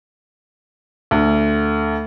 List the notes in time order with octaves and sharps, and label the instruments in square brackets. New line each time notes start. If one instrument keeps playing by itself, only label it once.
[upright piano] D2